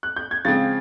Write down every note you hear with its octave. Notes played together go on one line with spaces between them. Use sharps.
F#6
G6
G#6
C#3 F3 G#3 C4 A6